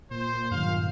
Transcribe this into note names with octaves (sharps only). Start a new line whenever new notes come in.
A#2 C5
G2 D#3 F#3 F5